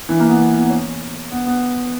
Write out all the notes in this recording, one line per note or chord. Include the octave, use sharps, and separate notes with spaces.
E3
A#3
B3
B3
B3
B3
C#4
B3
B3